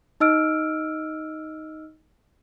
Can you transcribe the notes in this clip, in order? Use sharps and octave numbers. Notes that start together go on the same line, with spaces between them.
D#4 D#5 E6 F6 D7